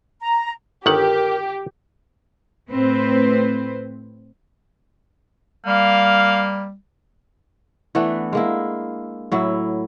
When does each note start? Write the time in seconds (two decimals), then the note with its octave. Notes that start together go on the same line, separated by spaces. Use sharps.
0.20 A#5
0.86 G1 D#3 G4 A#4 F#5
2.69 A2 C4 B4 C5
5.66 G3 A#3 F5
7.95 E3 A3 B3 D4
8.33 G#3 A#3 E4
9.32 A2 F#3 E4